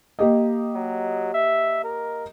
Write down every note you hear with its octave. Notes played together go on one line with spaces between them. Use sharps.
A#3 G4 D#5
F#3
E5
A#4